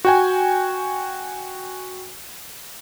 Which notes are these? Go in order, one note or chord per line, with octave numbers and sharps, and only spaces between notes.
F#4 G5 G#5